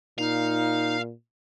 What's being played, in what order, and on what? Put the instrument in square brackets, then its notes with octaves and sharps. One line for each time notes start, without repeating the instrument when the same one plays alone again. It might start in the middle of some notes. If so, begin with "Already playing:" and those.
[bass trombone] A#2 [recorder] D#4 [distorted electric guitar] F5